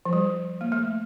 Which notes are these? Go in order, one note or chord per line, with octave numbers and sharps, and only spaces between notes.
F3
G3
A#3
A3